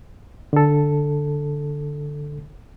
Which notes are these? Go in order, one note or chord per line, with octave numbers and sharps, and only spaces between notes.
D3 A4